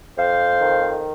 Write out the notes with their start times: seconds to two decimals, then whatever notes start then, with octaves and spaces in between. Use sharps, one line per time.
0.17 F2 C5 F5
0.60 D#3